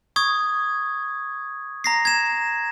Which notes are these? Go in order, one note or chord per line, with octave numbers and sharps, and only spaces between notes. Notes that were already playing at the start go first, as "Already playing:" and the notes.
C#6 D#6 G#6
A#5 A#6 C7
G#6 E7